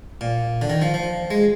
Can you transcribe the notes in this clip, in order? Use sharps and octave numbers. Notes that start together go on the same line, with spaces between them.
A#2
D3
D#3
F3
F3
G#3